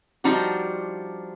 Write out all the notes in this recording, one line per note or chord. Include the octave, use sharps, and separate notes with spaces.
F3 G3 D4 D#4 F4 F#4